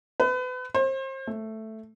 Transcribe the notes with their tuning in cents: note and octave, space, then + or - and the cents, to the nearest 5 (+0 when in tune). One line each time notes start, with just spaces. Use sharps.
B4 +35
C5 +35
A3 +0